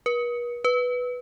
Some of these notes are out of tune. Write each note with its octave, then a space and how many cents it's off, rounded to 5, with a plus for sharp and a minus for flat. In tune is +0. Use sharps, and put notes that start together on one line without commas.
B4 -45
B4 +0